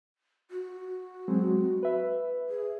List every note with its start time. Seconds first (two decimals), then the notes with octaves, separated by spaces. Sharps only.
0.51 F#4
1.28 F#3 G#3 C4
1.83 B4 E5
2.49 G#4